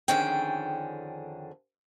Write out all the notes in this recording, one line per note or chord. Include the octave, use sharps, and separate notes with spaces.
F2 D3 D#3 C#4 G#4 G5